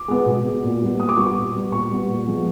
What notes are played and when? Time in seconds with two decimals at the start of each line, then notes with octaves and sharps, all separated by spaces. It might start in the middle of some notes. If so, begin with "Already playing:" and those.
Already playing: D6
0.08 G#3 B3
0.26 B2
0.45 G#3 B3
0.64 A#2
0.82 G3 B3
0.99 A#2 D#6
1.09 D6
1.17 G3 B3 C#6
1.27 D6
1.36 A#2
1.54 G3 B3
1.72 A#2 C#6
1.91 G3 B3
2.08 A#2
2.26 F3 G#3 B3